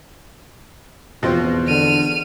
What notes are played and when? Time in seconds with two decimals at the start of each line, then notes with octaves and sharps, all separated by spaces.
1.23 E2 B2 F3 C4
1.68 D3 F6 D#7